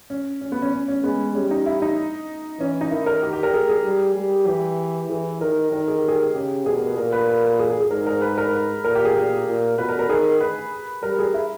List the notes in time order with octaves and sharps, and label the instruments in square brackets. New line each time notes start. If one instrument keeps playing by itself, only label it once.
[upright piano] C#4
C#4
B3
C#4
C#4
C#4
[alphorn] G#3 [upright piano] B3
[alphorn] G3 [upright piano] C#4
[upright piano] D#4
E4
D#4
[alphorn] E3 [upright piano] C#4
[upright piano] D#4
[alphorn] D#3 [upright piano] E4
[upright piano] A#4
G4
G4
A#4
G#4
G#4
[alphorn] G3
G3
[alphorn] E3 [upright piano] G4
[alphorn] E3 [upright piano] G#4
[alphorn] D#3 [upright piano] A#4
[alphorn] D#3 [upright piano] A#4
[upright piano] G#4
G4
G#4
[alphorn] C#3 [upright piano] G4
[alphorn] B2 [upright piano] G#4
[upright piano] A#4
B4
[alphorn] A#2 [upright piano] A#4
[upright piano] B4
B4
B4
G#4
G#4
G#4
[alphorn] G#2 [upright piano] A#4
[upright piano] A#4
B4
A#4
B4
[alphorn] A#2 [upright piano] A#4
[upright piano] G4
G#4
[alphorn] A#2 [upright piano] A#4
[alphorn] A#2
[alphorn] B2 [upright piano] B4
[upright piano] A#4
A#4
[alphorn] D#3 [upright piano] G#4
[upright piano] B4
[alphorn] G3 [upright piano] A#4
[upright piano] G#4
E4